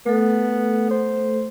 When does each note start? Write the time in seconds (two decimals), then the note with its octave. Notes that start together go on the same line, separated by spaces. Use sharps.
0.06 A3 B3 A4
0.90 C5